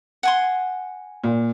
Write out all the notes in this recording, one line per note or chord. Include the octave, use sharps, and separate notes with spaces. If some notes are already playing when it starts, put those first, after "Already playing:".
F#5 G#5 C6
A#2